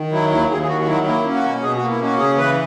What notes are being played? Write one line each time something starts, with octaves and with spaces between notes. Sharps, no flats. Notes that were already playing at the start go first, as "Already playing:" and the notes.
Already playing: D#3
F#3 E4
D#2 E4
D#2 G#4
G#4
D#3 F#4
F#4
F#3 E4
A#3 E4
C#4
F#4
B2
B2 G#4
F#4
A#3
E4
C#4 F#4
C#3 G#4
E3 B4